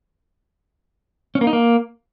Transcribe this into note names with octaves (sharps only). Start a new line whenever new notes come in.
C#4
A#3
D#4
A#3